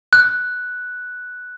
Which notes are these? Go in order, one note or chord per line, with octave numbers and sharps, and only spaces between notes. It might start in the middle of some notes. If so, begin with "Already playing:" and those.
F#6